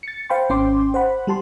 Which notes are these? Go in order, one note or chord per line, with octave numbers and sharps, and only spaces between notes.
A6 C#7
C5 F5 G5 B5 C6
G#1 C#4 C5 G5 C6 D6
C5 F#5 B5
G3 G4 A5 C6